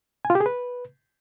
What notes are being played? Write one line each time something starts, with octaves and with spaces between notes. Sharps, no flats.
G#5
F4
G4
G#4
B4